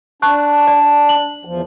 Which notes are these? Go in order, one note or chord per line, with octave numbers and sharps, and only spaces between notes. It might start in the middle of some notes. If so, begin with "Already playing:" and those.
D4 A5 C#6 F#6
D5
F#7
E2 F3